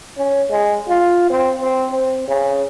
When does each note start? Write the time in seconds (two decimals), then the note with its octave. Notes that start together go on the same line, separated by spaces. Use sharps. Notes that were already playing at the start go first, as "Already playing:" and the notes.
0.18 C#4
0.51 G#3
0.89 F4
1.30 C4
1.60 C4
1.92 C4
2.28 C#3